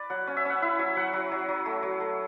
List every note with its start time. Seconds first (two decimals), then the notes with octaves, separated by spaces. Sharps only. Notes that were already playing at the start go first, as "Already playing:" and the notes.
Already playing: B4 D5
0.10 F#3 F#5
0.27 C#4
0.37 E5
0.45 C#4 F#5
0.62 E4 E5
0.79 F#3 E5
0.97 F#3 F#5
1.13 F#3
1.32 F#3
1.49 F#3
1.66 A3
1.83 F#3
2.00 A3